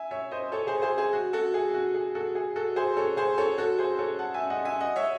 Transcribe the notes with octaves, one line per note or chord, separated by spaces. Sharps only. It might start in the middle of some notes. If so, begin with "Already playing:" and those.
Already playing: E5 G#5
C#5 E5
C5 D#5
A4 C#5
G#4 C5
G#4 C5
G#4
F#4
F#4 A4
G#4
F#4
G#4
F#4 A4
G#4
F#4 A4
G#4 C5
A4 C#5
G#4 C5
A4 C#5
F#4 A4
G#4 C5
A4 C#5
F#5 A5
E5 G#5
D#5 F#5
E5 G#5
D#5 F#5
C#5 E5